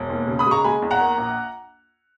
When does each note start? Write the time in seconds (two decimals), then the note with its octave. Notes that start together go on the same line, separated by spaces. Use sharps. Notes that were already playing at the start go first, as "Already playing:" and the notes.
Already playing: E1
0.10 D#2
0.27 C#3
0.39 B5 D#6
0.46 G#3
0.51 A#5 C#6
0.64 G#3 G#5 B5
0.82 E2
0.91 F#5 A#5
1.00 A#3
1.18 A#1